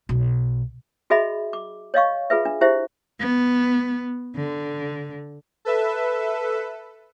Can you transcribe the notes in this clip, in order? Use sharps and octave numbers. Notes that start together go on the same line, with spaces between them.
B1
F#4 G#4 D#5 E5 B5
D6
C#5 D#5 F5 C#6
F4 G#4 B4 E5
D4
E4 G4 C5 E5
B3
D3
A4 B4 E5